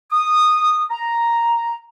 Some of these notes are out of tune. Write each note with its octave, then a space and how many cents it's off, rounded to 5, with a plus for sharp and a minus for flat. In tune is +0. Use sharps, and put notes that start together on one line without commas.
D#6 -10
A#5 +0